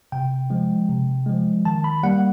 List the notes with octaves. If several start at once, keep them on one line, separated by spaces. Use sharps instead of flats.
C3 G5
F3 G#3
C3
F3 G#3
D#3 A5
B5
G3 A#3 F#5